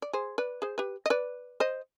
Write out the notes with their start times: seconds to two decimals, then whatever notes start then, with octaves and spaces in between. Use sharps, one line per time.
0.02 D5
0.13 G#4 C5
0.38 B4 D5
0.62 G#4 C5
0.78 G4 B4
1.06 D#5
1.10 B4 D5
1.60 C5 D#5